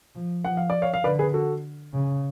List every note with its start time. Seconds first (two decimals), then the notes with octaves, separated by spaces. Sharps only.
0.15 F3
0.45 F3 F#5
0.57 F5
0.70 D5
0.82 C#5 F5
0.94 F5
1.04 D3 B4 D5
1.19 G#4 B4
1.34 F#4 A4
1.94 C#3